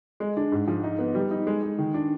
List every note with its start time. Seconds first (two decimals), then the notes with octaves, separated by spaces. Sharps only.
0.20 G#3
0.37 D4
0.52 G#2
0.68 F3
0.84 D#4
0.99 B3
1.15 G3
1.31 D#4
1.47 G#3
1.63 G#3
1.78 D#3
1.94 D4